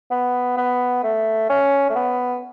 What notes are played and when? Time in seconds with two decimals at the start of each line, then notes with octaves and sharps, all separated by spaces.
0.11 B3
0.57 B3
1.03 A3
1.50 C#4
1.90 A3
1.96 B3